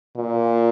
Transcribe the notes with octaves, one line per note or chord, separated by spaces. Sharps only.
A#2